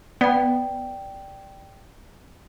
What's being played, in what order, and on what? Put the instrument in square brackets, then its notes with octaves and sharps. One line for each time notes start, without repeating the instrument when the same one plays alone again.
[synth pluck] B3 [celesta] D5 G5